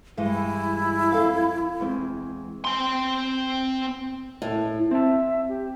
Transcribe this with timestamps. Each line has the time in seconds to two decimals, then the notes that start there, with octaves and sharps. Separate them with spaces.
0.17 G2 E3 G#3 E4
1.12 F2 A4 F5
1.80 E2 G#3 C4
2.65 C4 C6
4.42 A2
4.91 C4 E5 A5
5.49 G4